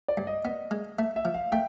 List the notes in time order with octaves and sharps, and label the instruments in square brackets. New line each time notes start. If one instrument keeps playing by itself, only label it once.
[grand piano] D5
[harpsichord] G2
[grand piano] D#5
[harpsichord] B3 [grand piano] D#5
[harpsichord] G#3
[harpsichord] A3 [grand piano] E5
[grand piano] E5
[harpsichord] F3
[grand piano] F5
[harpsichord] A3 [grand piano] G5